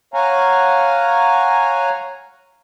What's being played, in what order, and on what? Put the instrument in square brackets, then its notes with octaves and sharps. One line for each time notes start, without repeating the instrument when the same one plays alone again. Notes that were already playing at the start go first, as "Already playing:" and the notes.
[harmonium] C#5 F5 F#5 G#5 A#5